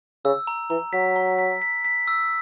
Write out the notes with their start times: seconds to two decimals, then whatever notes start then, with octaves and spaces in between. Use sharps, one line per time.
0.25 C#3 E6
0.47 A#5
0.70 E3 A#5
0.93 F#3 B6
1.16 A#5
1.39 B6
1.62 B6
1.85 B6
2.08 E6